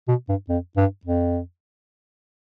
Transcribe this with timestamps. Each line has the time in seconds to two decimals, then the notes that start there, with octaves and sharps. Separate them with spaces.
0.08 B2
0.29 G2
0.49 F2
0.77 G2
1.05 F2